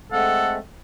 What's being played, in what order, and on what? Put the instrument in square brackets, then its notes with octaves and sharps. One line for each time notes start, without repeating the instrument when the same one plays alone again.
[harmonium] G#3 A3 C4 [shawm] A4 [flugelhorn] F#5